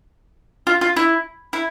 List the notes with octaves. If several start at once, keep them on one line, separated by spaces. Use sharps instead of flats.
F4
F4
E4
E4